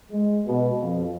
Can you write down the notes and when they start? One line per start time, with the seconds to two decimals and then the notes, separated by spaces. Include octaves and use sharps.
0.11 G#3
0.46 B2
0.80 F2